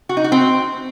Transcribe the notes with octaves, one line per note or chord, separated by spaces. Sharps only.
F#4
D#4
F#4
C4